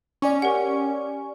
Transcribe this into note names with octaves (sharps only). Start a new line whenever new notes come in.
C#4 D5 G#5 C#6
G4 A#4 F#5